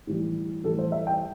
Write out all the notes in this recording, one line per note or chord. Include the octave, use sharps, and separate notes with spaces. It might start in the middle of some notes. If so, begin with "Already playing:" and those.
A2 E3 G3
A2 E3 G3 A4
C5
E5
G5